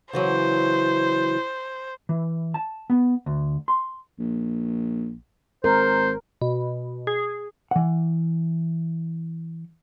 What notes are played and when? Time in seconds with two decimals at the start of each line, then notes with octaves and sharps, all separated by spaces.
0.13 C#3 E3 F#3 C5
2.09 E3
2.54 A5
2.90 B3
3.26 D2
3.68 C6
4.19 A#1
5.64 G#1 A#4 C5
6.41 B2
7.07 G#4
7.71 E3 F#5